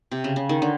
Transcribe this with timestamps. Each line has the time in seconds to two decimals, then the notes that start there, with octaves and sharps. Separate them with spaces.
0.12 C3
0.24 C#3
0.36 C#3
0.49 D#3
0.62 D3